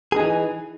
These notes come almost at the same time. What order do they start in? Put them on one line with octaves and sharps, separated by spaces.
G#4 D#4 E3